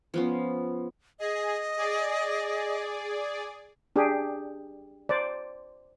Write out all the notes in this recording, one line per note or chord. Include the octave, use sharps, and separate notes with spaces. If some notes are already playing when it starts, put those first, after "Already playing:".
F3 B3 C#4
G#4 D#5
G#4 D5
D4 G4 G#4
C5 D5